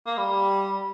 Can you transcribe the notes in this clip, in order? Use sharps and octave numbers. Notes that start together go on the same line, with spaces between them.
A#3
G3